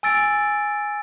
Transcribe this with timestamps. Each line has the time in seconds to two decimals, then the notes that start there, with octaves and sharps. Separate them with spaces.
0.03 G#5 E6 A6 D7